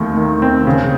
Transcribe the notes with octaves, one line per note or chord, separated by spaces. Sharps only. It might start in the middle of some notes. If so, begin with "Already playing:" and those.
Already playing: D#2 D#3 A3 C4
D#3
C4
C#3